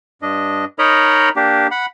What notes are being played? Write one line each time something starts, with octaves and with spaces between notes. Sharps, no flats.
G2 D4 D#5
D#4 A#4 C#5 D#5 A#5 B5
A#3 D4 G4
F#5 B5